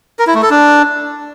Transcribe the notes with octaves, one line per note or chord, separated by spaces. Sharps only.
A#4
E4
A3
A4
D4